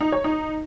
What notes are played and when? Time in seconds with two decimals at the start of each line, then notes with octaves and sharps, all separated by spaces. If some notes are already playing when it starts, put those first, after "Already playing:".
0.01 D#4
0.12 C#5
0.24 D#4